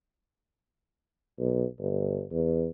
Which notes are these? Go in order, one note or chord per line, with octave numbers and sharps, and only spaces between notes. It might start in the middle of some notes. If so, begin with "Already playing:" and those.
B1
G1
E2